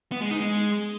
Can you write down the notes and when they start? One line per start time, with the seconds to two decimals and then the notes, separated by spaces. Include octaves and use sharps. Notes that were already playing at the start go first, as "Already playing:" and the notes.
0.12 B3
0.21 G#3
0.31 D#4
0.40 G#3